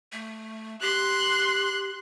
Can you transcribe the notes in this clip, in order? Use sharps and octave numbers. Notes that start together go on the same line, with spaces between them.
A3
G4 C6 F#6